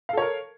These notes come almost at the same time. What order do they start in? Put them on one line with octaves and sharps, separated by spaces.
F5 A4 C#5 A#4